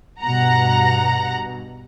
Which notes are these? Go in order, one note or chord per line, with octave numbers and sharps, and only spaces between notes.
G2 B2 F#5 A#5